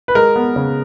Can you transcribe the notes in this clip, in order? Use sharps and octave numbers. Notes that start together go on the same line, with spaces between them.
B4
G#3 A#4
B3
C#3